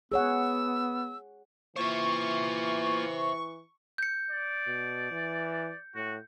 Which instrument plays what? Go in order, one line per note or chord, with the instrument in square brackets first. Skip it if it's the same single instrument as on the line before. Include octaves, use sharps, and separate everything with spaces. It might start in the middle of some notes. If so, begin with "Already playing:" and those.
[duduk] B3 [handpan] G#4 C#5 F#5 [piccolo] E6
[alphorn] E3 [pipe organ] A#3 F4 [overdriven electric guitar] C5 E5 [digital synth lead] C#6
[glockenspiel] G6 C#7
[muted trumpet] D5
[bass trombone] B2
E3
[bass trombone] A2 [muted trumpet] F#4